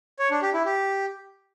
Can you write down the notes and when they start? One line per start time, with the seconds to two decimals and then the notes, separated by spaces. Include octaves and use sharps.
0.19 C#5
0.31 D4
0.42 G4
0.54 E4
0.65 G4